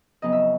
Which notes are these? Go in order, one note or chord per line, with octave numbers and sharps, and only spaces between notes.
F2 C#3 F#3 B3 D#4 D#5
E5